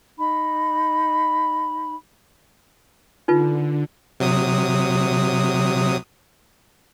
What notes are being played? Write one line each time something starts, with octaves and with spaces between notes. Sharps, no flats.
D#4 B5
D3 D#4 F4 B4
C3 F#3 D#6